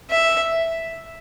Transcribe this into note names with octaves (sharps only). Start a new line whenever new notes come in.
E5